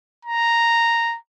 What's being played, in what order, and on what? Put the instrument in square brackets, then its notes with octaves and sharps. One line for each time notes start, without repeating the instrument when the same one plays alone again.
[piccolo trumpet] A#5